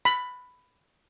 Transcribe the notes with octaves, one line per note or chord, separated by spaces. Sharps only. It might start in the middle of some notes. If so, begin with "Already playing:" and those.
B5